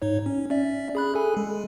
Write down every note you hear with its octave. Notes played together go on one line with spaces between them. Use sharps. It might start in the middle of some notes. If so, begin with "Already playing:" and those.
G#2 D#4 C#5
C#4
C#4 D5 E5
G#4 B5 F#6
G#4 A4 G#5
G#3